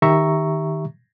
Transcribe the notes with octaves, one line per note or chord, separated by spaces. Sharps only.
D#3 G4 E5 A#5 C#6